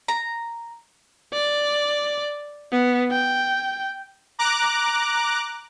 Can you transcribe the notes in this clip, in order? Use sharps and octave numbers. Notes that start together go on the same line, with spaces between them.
A#5
D5
B3
G5
A#5 D6 F#6